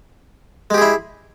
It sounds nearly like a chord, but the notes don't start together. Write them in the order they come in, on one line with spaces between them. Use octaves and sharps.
G#3 G4 G#4 E4